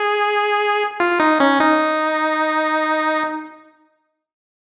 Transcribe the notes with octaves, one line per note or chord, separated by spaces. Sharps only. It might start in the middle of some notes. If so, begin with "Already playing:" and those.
Already playing: G#4
F4
D#4
C#4
D#4